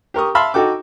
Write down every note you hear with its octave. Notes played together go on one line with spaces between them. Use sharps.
G4 A#4 C#6 D#6
E5 F5 A5 B5 C6 F6
D#4 F#4 A4 G5 D6